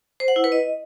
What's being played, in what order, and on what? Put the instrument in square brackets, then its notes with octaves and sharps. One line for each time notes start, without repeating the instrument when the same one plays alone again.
[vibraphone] C5
F#5
E4
B4
D#5